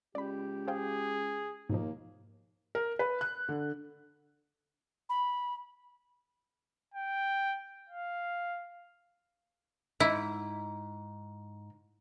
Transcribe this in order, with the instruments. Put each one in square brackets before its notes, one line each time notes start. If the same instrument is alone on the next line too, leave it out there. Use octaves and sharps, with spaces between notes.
[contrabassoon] C#2 [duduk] G4 [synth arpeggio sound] D5 B5
[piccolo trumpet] G#4 [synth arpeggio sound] C5 F5 G5
[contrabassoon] D#2 [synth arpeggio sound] G#2 B2 F3 [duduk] A#3
[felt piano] A#4
B4
F#6
D3
[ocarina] B5
[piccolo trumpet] G5
F5
[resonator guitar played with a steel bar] G#2 [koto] E4